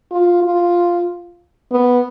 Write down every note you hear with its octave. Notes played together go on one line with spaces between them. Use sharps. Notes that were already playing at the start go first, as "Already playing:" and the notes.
F4
F4
B3